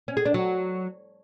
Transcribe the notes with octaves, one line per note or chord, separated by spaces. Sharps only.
C#4
G#4
D4
F#3